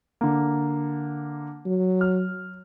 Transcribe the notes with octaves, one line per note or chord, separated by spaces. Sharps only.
D3 A#3
F#3
F6